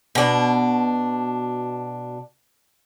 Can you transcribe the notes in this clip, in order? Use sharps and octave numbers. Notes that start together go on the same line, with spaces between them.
B2 D4